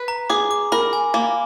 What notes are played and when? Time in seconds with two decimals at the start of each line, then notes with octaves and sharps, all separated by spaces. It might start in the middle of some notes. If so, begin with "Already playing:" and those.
Already playing: B4
0.08 A#5
0.30 G#4 D6
0.51 D6
0.72 A#4 B5
0.93 G#5
1.14 A#3